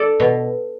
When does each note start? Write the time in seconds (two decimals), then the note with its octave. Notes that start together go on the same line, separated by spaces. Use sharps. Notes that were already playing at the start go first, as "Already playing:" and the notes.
Already playing: A4 D5
0.20 B2